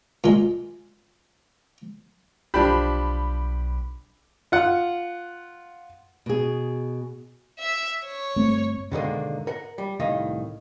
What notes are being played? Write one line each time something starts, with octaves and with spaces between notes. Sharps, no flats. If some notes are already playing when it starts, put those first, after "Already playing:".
A#2 G#3
B1 F3 D4 G4 B5
F4 F#5
B2 G#4
E5
C#5
G1 A3 C4
G#2 B2 D3 D#3 G#3 A#3
A#4 F#5
G3
C2 A2 D#3 D#5 F5